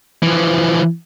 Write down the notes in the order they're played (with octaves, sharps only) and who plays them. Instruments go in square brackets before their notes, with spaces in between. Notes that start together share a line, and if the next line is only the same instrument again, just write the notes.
[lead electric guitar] E3 F3